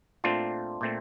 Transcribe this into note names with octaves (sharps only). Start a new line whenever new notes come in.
A#2 A3 C4 D4 F4
A#2 A3 C4